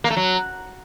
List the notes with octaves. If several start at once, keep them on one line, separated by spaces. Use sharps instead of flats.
A#3
A3
F#3